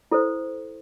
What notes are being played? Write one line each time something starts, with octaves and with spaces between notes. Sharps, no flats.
E4 A4 C5